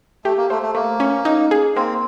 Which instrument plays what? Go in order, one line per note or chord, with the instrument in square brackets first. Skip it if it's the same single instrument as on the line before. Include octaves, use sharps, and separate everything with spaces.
[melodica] A3 [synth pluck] G4
[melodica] A#3
[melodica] A3 [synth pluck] C5
[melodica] A3
[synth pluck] A3 [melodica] A#3
[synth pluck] C#4
D#4
G#4
[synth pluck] A#3 [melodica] C4